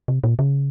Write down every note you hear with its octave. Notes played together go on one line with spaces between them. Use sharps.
C3
A#2
C#3